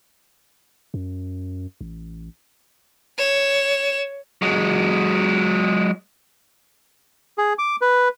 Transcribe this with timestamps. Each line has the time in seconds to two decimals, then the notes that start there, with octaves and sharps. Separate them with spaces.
0.94 F#2
1.81 A1
3.18 C#5 E7
4.42 F#3 G#3
7.38 G#4
7.59 D6
7.81 B4